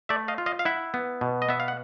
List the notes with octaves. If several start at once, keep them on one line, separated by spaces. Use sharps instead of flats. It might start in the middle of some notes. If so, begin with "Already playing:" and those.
A3 D5 E5
D#5 F5
F4
D#5 F5
F5
E4 E5 F#5
B3
B2
D#5
B3 E5
F5
F#5